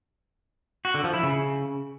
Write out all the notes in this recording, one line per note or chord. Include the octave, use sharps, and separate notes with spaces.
F#4
D3
F3
E4
C#3